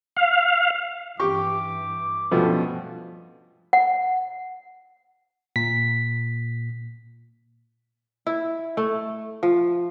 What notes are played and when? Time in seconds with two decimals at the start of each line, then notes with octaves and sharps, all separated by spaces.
0.16 F5
1.20 G2 E3 G4 C#6 D6
2.31 G2 B2 F3 G3 A3 C#4
3.73 F#5
5.56 A#2 B6
8.27 E4
8.77 A3
9.43 F3